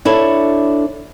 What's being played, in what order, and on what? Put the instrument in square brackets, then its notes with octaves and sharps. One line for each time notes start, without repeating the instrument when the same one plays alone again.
[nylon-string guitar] D4 E4 A4 C#5